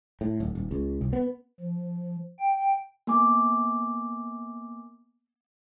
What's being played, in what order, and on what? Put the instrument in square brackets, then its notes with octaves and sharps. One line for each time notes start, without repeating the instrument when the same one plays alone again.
[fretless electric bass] A2
D1
D#1
C#2
C2
B3
[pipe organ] F3
G5
[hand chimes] A#3 B3 G#5 D6